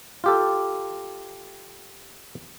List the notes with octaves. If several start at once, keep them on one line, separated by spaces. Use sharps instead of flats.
F4 G4 A4